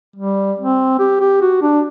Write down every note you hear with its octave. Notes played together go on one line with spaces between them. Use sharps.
G3
C4
G4
G4
F#4
D4